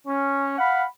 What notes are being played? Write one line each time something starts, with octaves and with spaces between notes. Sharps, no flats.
C#4
F5 F#5 B5